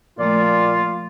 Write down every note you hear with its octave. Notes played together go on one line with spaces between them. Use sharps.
A#2 F3 A3 F4 D5